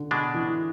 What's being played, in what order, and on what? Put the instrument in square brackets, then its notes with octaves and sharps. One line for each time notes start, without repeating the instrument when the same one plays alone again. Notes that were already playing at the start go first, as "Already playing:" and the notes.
Already playing: [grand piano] D3
[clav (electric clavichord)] B2 G#3 D4
[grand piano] E3